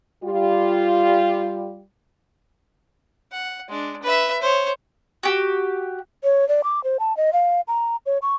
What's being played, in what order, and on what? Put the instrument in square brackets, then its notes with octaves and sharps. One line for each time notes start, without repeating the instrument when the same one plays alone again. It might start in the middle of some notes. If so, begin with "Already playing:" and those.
[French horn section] G3 F4 G4
[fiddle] F#5
G#3 D4
B4 E5
C5 C#5
[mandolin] F#4 G4
[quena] C#5
D5
D6
C5
A5
D#5
F5
A#5
C#5
C#6